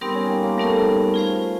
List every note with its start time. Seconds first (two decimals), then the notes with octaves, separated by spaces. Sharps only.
0.01 G3 B3 C4 D#4 G4 A#4
0.15 C#4
0.30 A#3
0.43 A#3
0.57 G3 A3 B3 D#4 G4 A#4
1.14 F4 G#4 C5 F5